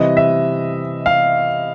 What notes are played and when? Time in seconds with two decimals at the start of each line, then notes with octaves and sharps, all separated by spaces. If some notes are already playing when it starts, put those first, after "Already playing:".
Already playing: C3 E3 G3 D#5
0.17 E5
1.06 F5